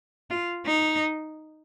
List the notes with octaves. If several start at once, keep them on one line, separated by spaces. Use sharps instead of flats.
F4
D#4